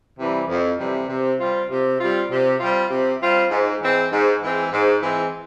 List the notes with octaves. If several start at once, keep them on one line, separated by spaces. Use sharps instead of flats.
C3 E3 G3
F2
C3 E3 G3
C3
G3 C4 F4
C3
G3 C4 F4
C3
G3 C4 F4
C3
G3 C4 F4
G#2
E3 G#3 C4
G#2
E3 G#3 C4
G#2
E3 G#3 C4